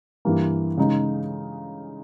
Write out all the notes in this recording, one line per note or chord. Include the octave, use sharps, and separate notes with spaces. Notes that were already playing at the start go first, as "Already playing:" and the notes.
G2 E3 A#3
C#3 G#3 D#4